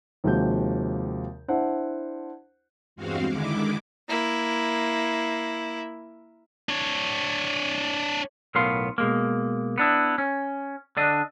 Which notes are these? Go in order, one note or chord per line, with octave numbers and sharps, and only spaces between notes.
D#2 C3 F3 G#3 F#4 G6
D4 E4 C5 F#5
E2 G2 G#3 C4 F#4 F5
D3 D#3 G#3 E4 D6
A#3 E4
D4 C#5
B1 A2 B3 A#4 F5 C6
B2 G#3 A#3
B3 D4 E4
C#4
D3 D4 D#5